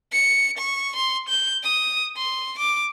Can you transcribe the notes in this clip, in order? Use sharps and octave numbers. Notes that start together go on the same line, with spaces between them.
C#7
C#6
C6
G6
D#6
C6
D6